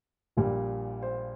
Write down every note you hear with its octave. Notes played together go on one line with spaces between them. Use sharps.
A#1 A#2 G3
C5